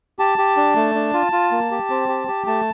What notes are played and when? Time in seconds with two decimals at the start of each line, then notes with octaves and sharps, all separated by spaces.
0.19 G4 A5
0.38 G4
0.57 D4
0.76 A3
0.95 D4
1.14 F4
1.32 F4
1.51 A#3
1.71 G4
1.90 C4
2.09 G4
2.28 G4
2.47 A3 A5